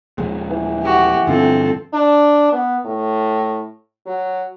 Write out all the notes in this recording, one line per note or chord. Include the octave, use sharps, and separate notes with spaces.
D#1 F3 G#3
E3
F#4 G4
G2 D3 F3 C4 A4
D4
B3
A2
F#3